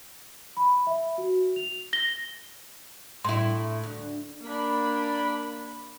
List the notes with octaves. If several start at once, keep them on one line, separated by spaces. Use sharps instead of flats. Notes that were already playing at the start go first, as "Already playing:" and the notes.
B5
E5
F#4
F7
A#6 G7
A2 E4 C6
D2
A#3 D4 B5